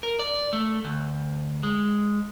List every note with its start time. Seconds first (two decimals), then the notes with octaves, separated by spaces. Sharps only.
0.03 A#4
0.19 D5
0.53 A3
0.85 D2
1.63 G#3